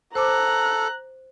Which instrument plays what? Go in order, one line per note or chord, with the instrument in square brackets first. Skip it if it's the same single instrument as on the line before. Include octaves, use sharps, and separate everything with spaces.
[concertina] A4 [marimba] C5 D6 [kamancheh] A#5 F#6